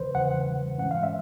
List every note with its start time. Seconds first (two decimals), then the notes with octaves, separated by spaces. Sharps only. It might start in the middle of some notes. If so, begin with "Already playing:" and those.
Already playing: E2 C#3 E3 B4 C5
0.15 E2 C#3 E3 F#5
0.78 G#2 E3 G#3 C#4 F#5
0.91 F5
1.03 E5